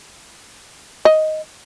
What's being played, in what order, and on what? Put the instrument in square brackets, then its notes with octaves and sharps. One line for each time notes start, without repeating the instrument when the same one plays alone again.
[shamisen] D#5